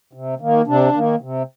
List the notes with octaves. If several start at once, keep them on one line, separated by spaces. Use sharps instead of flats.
C3
D#3 A#3
C3 D4
D#3 A#3
C3